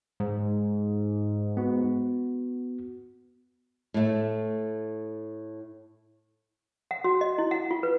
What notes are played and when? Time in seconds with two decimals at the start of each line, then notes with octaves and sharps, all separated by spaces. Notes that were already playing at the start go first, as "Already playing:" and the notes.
0.20 G#2
1.57 B3 F#4
3.94 A2 A3
6.91 F#5
7.04 F#4
7.21 D#5
7.38 E4
7.51 F#5
7.71 F4
7.83 B4